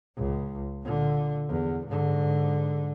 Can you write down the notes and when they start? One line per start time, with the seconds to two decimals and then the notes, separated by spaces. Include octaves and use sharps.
0.17 C#2
0.83 A#2 D3
1.49 E2
1.87 G#2 D3